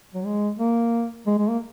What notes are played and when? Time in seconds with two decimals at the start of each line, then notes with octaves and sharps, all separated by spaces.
0.14 F#3
0.25 G#3
0.59 A#3
1.27 G#3
1.38 G#3
1.50 A#3